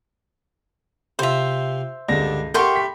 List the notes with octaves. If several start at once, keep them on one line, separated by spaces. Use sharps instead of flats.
C3 F4 C5 E5
C#2 G2 D3 A#6
A3 G4 A#4 F#5 G5 C6 C#6
B5 B6